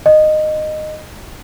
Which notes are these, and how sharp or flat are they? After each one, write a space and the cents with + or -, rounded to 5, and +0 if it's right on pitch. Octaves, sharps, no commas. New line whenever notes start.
D#5 -15